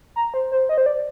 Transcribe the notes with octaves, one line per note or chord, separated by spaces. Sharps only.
A#5
C5
C5
D#5
C5
D5